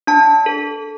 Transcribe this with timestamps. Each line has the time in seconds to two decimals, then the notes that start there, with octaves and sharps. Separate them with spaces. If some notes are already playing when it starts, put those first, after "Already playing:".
0.07 D4 A5
0.46 A4